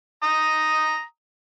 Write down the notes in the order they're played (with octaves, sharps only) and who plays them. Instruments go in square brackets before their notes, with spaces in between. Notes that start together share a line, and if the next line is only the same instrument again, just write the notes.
[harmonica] A#5 D#6